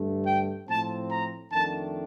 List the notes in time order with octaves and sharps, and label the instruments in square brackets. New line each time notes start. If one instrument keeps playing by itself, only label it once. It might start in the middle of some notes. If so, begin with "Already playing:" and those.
Already playing: [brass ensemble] G2 D3 A3
G5
A2 F3 C4 A5
A#5
F2 D#3 A3 D4 A5